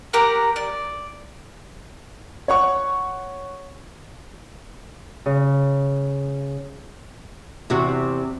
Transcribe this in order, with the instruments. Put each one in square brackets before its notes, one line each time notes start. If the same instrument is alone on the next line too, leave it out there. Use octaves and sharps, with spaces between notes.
[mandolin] G4 A#4 F#5
D5
[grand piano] C#5 F#5 C#6
[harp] C#3
[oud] E2 C3 F#4